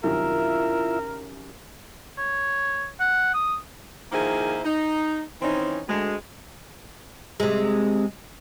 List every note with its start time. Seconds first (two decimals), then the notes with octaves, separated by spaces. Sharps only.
0.03 C2 F#2 D#3 E4 F4 A#4 E5
2.18 C#5
3.00 F#5
3.34 D#6
4.12 D#3 F3 A#3 E4 G#4 C5
4.64 D#4
5.42 D#3 E3 C4 C#4 D#4
5.88 D2 G#3
7.40 C3 G#3